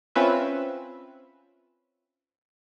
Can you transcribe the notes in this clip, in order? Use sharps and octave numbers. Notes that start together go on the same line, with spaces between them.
C4 C#4 F4 B4 E5